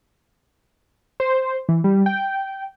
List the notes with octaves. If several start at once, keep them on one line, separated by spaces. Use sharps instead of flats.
C5
E3
G3
G5